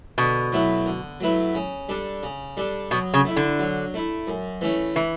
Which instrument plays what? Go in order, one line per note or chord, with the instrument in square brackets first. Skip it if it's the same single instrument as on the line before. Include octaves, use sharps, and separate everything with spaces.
[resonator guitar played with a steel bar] B2 [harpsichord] D3
[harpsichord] F#3 A3 E4 B4
D3
F#3 A3 E4 B4
C#3
G3 D4 A4
C#3
G3 D4 A4
[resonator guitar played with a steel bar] B2 [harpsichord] F#3
[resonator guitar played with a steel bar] C#3
[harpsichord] A3 E4
[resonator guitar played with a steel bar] D3
[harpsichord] F#3
A3 E4
F#2
E3 A3 C#4
[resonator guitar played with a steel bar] E3